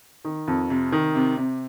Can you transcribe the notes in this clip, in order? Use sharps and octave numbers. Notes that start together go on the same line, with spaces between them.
D#3
F2
C3
D#3
C3
C3